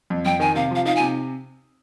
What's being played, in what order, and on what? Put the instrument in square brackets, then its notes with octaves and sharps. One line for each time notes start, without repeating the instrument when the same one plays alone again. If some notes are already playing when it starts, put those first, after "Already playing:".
[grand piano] F2
[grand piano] F2 [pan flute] G5
[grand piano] D#3 [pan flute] G#5
[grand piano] C3 [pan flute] F5
[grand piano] F3 [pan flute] F5
[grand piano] D#4 [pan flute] F5
[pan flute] G#5
[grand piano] C3